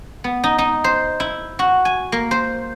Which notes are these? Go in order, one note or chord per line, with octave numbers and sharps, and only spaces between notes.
B3
D#4
D#4
C5
E4
F#4
G#5
A#3
C5